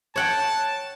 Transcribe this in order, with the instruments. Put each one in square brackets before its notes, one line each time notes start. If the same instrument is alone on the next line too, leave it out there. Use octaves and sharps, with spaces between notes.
[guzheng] C#5 F#5 G5 [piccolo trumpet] A5